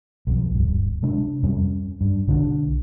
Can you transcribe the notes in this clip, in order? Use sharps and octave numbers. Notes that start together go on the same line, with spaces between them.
B1 F2
D1 G2
C3 G#3 D4
F2 G3 C#4
G2
B1 D3 G#3 D4